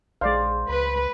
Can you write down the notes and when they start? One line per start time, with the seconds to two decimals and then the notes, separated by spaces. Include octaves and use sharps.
0.21 A#1 G#3 C5 D5 F5
0.69 C#2 B4